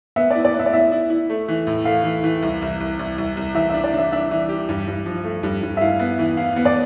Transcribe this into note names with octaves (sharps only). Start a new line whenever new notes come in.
B3 E5
E4 D5
D5
B3
E5
D5
E4 E5
E4
E4
A3
E3
A2
A3 F5
E3
E3
C2
C2
C2
C2
C2
C2
E3 E5
D4 E5
D5
D4 E5
D4 E5
E3
G4
G2
G2
F3
A3
G2
G2
E5
E4 F5
B3
E3
E4 F5
B3
D5